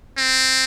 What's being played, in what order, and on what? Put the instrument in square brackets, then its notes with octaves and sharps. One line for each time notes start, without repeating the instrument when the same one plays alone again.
[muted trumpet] C4